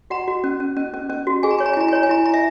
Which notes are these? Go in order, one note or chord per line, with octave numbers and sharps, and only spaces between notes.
F#4 F#5 A#5
F#4
C#4
C#4
C#4
C#4
C#4
F#4
G#4 G#5
A#5
C#5 G#5
A#5
G#5
E4 A#5
G#5
C#5 A#5
G#5
E4 A#5
G#5
E4 A#5
E5 G#5